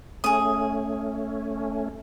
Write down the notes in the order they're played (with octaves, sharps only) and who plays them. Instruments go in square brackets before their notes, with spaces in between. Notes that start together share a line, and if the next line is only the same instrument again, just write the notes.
[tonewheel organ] A3 C#4 [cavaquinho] G#4 D#6